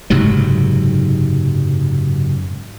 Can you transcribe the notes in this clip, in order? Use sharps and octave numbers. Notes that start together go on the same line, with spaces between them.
F#1 G#2 C3 F#3